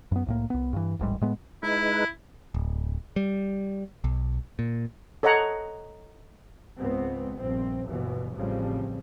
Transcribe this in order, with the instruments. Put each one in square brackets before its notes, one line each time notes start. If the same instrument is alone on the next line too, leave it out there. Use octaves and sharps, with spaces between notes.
[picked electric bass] F#2 B3
C2 A2 A#3
C2 B3
G2 E3
D1 A1 G#2 G3
A2 G#3 B3
[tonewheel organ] G#3 D#4 B4 [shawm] E4
[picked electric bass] D1
G3
B1
A#2
[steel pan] A4 C#5 D#5 F#5 A#5
[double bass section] C#2 G#2 B3 C4
A#1 G2 C4
G1 D#2 B2 E3
A1 A2 C#3 F3 G3 C4